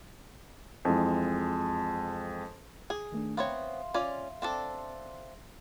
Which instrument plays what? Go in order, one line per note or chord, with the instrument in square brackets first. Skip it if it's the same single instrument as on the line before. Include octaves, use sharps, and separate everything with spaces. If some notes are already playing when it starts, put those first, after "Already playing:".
[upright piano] F2 E3 G#3
[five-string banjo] G#4
[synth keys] D#3 A3 D4
[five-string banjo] B3 C4 C#5 [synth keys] E5 F5 C6
[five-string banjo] C#4 F4 D5
C4 D4 A4